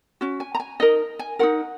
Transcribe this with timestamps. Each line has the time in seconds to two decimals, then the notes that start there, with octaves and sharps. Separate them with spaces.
0.21 C#4 F#4
0.40 G#5
0.55 A#5
0.60 G#5
0.80 D#4 A#4 D#5
1.19 G#5
1.39 D#4 F#4 A#4 F#5